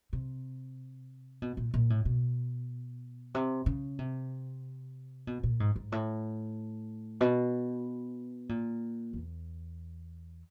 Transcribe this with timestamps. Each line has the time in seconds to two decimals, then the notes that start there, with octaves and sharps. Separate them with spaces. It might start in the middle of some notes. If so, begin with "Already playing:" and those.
0.13 C3
1.42 B2
1.57 A#2
1.74 A#2
1.90 A2
2.05 B2
3.35 C3
3.66 C#3
3.99 C3
5.27 B2
5.43 A#2
5.60 G#2
5.76 G#2
5.92 A2
7.21 B2
8.49 A#2
9.13 E2